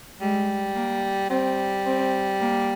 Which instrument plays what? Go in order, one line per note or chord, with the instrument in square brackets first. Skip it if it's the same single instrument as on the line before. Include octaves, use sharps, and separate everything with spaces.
[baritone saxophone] G3 [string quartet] G#3
[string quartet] A#3
[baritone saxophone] G3 [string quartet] C4
[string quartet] C4
A#3